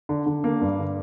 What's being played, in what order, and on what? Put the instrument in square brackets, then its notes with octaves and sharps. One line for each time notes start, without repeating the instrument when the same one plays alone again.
[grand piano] D3
D3
A#3
G2
D3